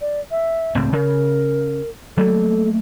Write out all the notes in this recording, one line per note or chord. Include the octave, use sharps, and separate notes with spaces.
D5
E5
C#2 A2 C4
C#3 A#4
F#3 A3 A#3 A4